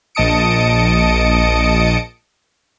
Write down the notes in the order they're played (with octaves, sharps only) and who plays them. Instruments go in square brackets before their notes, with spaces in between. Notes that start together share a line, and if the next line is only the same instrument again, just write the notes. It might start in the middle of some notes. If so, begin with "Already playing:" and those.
[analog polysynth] A#1 D#5 A5 D#6 C#7 D7